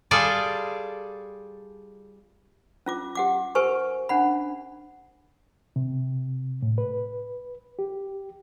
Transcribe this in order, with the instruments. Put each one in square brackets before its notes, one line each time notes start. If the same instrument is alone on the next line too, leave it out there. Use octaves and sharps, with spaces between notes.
[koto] G3 F4 G#4 A4 D5
[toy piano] C#4 F4 D6
G4 F#5 D6
G4 A#4 C5 G#5 C#6
C#4 D4 F#5 B5
[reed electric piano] C3
A2
B4
G4